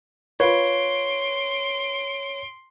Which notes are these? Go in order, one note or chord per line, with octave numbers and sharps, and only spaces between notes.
F4 B4 C#5 C6 D7